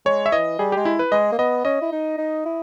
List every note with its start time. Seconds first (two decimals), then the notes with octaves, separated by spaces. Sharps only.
0.06 G#3 C#5
0.26 E5
0.32 E3 D#5
0.59 G3 G#4
0.72 G#3 G4
0.85 E4
0.99 B4
1.12 G#3 D#5
1.32 A#3
1.38 B3 D#5
1.65 C#4 D#5
1.81 E4
1.92 D#4
2.18 D#4
2.45 E4